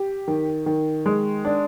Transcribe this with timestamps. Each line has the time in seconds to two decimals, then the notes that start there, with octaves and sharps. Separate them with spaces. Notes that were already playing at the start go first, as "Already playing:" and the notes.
Already playing: G4
0.28 D#3
0.66 D#3
1.06 G#3
1.45 D4